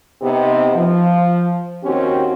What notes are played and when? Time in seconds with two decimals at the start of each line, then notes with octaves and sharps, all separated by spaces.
0.22 C3 B3 C4 D#4 G4
0.75 F3
1.84 D#2 C4 C#4 F#4 G4